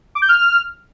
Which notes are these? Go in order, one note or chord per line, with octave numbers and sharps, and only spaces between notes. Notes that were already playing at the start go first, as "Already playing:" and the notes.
D6
G6
F6